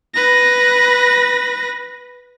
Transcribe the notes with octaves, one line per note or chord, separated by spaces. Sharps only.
B4 A#6